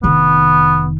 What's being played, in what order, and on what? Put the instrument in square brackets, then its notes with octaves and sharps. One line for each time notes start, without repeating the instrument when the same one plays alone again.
[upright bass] F1 D#3 [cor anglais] B3